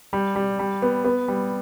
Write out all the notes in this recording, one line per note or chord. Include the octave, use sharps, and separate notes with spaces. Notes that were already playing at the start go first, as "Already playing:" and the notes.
G3
G3
G3
B3
B3
G3